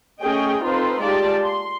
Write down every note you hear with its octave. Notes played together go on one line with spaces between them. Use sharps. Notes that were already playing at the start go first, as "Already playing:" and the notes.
A3 C#4 G#4 D#5 G5
C4 D#4 F4 A4 B4 C5
G#3 F4 G4 D5 A5
C6